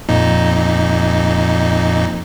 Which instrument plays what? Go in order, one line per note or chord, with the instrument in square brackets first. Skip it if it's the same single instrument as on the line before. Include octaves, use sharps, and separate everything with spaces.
[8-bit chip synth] F2 A#2 D#4